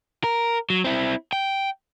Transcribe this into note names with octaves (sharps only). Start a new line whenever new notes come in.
A#4
F#3
C4 E4
G5